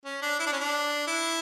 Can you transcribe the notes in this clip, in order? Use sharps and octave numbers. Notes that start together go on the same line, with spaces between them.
C#4
D4
E4
D4
C#4
D4
E4